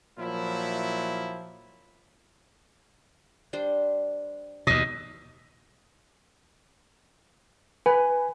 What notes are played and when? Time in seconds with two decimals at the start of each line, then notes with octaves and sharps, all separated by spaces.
0.18 A#2 F3 F#3 E4
3.53 G3 D4 C5
4.67 D#2 B2 D#5
7.86 B4 G#5